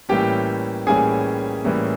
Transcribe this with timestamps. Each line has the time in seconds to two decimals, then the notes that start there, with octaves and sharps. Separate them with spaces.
0.09 A2 E3 G3 A#3 C#4 G4 G5
0.87 A2 E3 G3 A#3 C#4 G#4 G#5
1.64 A2 E3 G3 A#3 C#4